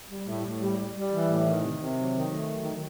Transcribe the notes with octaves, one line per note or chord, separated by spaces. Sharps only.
G3
A2
A2
G3
G3
G3
E3
A2
D#3
C3
C3
F#3
D#3
A3
F#3
D#3